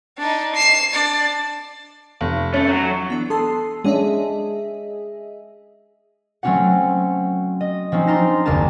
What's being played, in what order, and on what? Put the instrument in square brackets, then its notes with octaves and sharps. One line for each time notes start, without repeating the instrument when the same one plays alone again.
[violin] D4 D#4
C7 E7
D4 D5
[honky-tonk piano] F1
[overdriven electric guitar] A3 [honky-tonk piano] C#4
[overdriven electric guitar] F#3
[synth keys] E3 B3 D4
[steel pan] A4 [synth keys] C6 D#6 C7
[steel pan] G#3 C#4 D4 [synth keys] G#4 D#5 E5
[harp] F#3 A3 C4 C#4 F#4 F#5
D#5
F3 C4 C#4 D#4
D4 D#4 A#5 C6 F6 A#6
F#1 D#2 G#4 A#4 A5